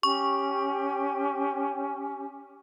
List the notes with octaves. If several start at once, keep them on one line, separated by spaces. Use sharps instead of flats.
C#4 G4 C#6